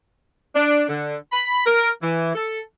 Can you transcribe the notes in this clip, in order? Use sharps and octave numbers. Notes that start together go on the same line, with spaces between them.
D4
D3
B5
A#4
E3
A4